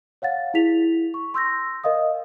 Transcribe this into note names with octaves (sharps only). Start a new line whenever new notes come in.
C#5 F5 F#5 A6
E4 G#4 B6 F7
C#6
C6 E6 G6 A#6
A#4 D#5 F5 D#6